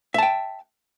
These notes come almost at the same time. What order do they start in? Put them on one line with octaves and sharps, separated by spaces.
E5 A5 G5